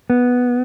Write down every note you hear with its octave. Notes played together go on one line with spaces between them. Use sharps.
B3